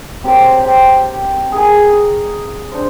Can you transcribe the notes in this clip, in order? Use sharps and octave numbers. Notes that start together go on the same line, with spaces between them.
C4 G4 A#4 C#5
G4 C5
G#4 A#4
D4 C5